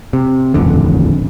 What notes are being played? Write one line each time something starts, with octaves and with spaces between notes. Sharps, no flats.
C3
D#1 A1 F2 D3